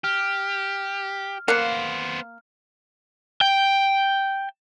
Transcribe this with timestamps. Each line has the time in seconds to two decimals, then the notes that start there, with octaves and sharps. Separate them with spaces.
0.04 G4 F6
1.48 A#3 B3 C5 F5 F#6 C#7
3.41 G5